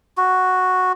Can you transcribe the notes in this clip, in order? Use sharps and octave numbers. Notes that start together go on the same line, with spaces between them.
F#4